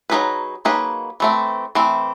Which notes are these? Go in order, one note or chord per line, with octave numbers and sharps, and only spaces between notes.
F#3 A#3 D#4 G#4 B4
F#3 A#3 D#4 G#4 B4
E3 A3 C4
E3 A3 C4